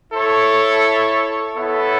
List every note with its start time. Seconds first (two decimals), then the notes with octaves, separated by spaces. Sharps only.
0.11 E4 A4 C#5
1.57 B3 E4 A4 C#5 E5